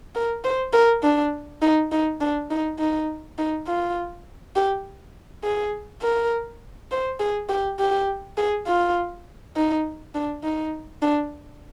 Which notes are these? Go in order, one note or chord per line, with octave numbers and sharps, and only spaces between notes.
A#4
C5
A#4
D4
D#4
D#4
D4
D#4
D#4
D#4
F4
G4
G#4
A#4
C5
G#4
G4
G4
G#4
F4
D#4
D4
D#4
D4